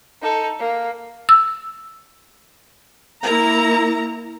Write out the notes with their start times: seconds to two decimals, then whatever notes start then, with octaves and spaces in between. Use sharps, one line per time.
0.22 D#4 A4
0.60 A#3
1.29 E6
3.23 A#3 E4 A#4 A#5